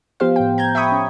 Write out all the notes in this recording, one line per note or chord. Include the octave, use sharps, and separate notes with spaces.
F3 B3 G4 C5 F5
A2 G5
A#5 G6 G#6
E5 G5 B5 C#6 D#6
C#4